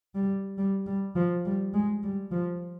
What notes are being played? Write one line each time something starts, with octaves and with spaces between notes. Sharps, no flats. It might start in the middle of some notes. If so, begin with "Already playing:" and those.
G3
G3
G3
F3
G3
G#3
G3
F3